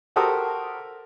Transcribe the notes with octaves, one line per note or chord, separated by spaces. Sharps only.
F#4 G4 A4 A#4 C5 D#6